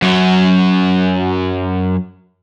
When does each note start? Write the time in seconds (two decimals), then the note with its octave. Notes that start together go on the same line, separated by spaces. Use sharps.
0.02 F#2 F#3